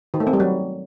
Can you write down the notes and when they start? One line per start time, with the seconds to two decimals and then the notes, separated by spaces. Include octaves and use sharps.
0.14 D#3
0.20 A3
0.27 C4
0.33 G3
0.40 F#3